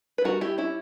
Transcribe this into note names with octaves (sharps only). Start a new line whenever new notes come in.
B4
G3 F#4 A#4
E4 G4
C#4 E4